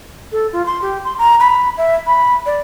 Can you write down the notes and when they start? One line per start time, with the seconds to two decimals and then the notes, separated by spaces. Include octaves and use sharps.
0.32 A4
0.53 F4
0.66 C6
0.82 G4
1.05 C6
1.18 A#5
1.40 B5
1.78 E5
2.07 B5
2.46 D5